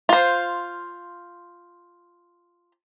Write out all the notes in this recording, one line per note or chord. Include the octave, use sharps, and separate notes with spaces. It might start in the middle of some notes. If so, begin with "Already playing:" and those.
F4 C5